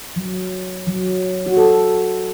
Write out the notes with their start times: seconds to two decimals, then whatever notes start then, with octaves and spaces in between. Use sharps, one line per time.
0.16 F#3
0.87 F#3
1.46 F#4
1.57 A4